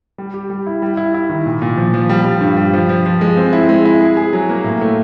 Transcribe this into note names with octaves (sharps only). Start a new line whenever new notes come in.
G3
G4
G3
E4
G3
E4
E4
D#3
A#2
A#2
F3
F3
G3
G3
G2
G3
F3
F3
F3
G#3
C4
E4
G#3
E4
G#4
G#4
F#3
A#3
A2
A3